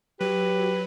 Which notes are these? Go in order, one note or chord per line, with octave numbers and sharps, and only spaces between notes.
F#3 G4 B4